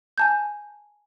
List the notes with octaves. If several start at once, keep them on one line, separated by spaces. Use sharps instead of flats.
G#5 A5 G6